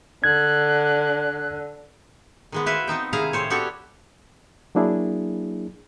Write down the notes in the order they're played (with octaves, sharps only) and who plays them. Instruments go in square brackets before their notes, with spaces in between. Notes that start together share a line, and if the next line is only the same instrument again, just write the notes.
[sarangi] D3 [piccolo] F#6 [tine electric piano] G#6
[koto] D#3 G#3 B3
E4 F#4 B4 C5 E5 F5
B3 C4 D#4 G5
C3 D#3 E4 G#4 F5 A#5
A2 C4 C5 C#5
B3 F#4 G4 A4 C#5 D5
[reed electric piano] F#3 A#3 D4 E4 G#4